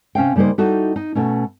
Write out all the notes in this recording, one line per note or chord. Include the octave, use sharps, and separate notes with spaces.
C3 C#4 F5 G5
C#3 G3 A#3 D#4 C5
G3 D#4 E4 F#4 A4
D#4
B2 A3 C#4